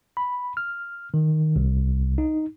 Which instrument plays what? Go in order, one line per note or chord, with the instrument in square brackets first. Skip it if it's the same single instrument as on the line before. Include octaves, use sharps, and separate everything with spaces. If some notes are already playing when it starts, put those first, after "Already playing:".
[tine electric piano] B5
F6
D#3
C2
D#4